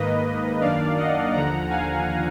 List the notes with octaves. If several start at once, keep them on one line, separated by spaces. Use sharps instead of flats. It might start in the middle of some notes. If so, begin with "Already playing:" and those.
Already playing: G#2 D#3 A#3 B4 D#5
F#2 D#3 A#3 D4 D5 F5
D#5 F#5
D#2 D3 F3 F#5 A#5
F5 G#5